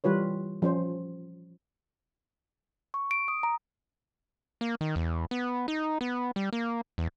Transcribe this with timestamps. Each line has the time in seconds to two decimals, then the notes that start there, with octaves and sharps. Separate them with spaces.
0.04 E3 G3 F4 B4 C#5
0.62 F3 C#4 C5
2.94 C#6
3.11 D7
3.28 D#6
3.43 A#5
4.61 A#3
4.81 D#3
4.96 E2
5.31 B3
5.68 D#4
6.01 B3
6.36 G3
6.53 A#3
6.98 E2